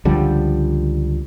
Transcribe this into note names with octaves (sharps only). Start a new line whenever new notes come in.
C#2 D3 F3 G3